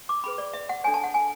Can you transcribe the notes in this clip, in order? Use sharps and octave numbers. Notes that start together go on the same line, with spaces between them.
D6
C#4 G#4 B4 B5
D5
E5
F#5
D4 A4 C#5 G#5
A5
F#5
G#5